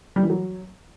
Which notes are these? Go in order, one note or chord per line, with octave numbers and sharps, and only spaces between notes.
G3
E3
F#3